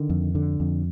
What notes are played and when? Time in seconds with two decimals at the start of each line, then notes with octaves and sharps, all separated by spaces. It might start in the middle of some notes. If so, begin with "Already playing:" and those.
Already playing: D3 D#3
0.10 F2
0.35 D3
0.60 F2